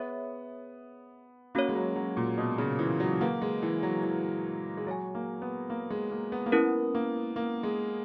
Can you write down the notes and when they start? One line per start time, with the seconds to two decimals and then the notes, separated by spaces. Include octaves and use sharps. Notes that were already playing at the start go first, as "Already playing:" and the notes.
Already playing: B3 G#4 C#5 E5
1.55 A#3 C#4 F#4 C#5
1.69 G#3
1.75 F#3
1.96 F#3
2.17 A#2
2.38 B2
2.58 C#3
2.79 E3
3.00 F#3
3.21 A#3 G#4 B4 F#5
3.42 G#3
3.62 E3
3.83 F#3
4.03 E3
4.77 G#3
4.86 F#3 G#4 C#5 G#5
5.15 A#3
5.42 B3
5.70 A#3
5.90 G#3
6.11 A#3
6.32 B3
6.46 A#3
6.52 B3 C#4 E4 A#4
6.95 A#3
7.36 A#3
7.63 G#3